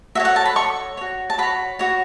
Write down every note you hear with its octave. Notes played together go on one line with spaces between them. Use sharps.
F#4 A4 C#5 E5
F#5
A5
B5
F#4 A4 C#5 C#6
F#4 C#5
A5
F#4 C#5 B5
F#4 C#5